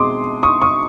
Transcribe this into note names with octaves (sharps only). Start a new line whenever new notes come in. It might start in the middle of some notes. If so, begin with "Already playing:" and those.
Already playing: B2 G#3 C4 C6 D6 D#6
C#6 D#6
C#6 D#6